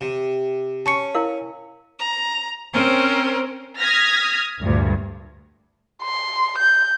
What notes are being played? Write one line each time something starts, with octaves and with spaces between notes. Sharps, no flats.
C3
C#4 A5 C#6 C#7
E4 A#4 F5
A#5
C4 C#4 A#4 C5
D#6 F6 G#6 A#6 B6
D2 G2 A#2
C6
G6